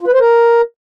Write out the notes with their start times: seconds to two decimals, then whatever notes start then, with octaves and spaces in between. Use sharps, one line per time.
0.01 F4
0.07 B4
0.14 C5
0.20 A#4